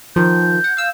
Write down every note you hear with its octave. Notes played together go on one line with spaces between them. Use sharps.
D#3 F3 G6
F#5
F5 E6